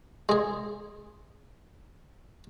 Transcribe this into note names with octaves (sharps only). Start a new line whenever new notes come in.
G#3 G#4